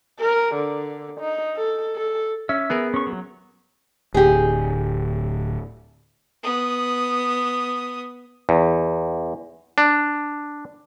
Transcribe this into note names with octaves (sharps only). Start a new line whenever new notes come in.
A#4
D3
D#4
A4
A4
C#4 E5
B3 G#4 A#4
C#4 C#6
F#3
D1 G4 G#4
B3 D#6
E2
D4